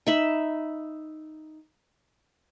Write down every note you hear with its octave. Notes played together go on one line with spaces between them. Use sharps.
D#4 E5 B5